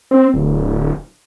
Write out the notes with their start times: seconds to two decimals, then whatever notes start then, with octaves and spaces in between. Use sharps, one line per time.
0.11 C4
0.34 D1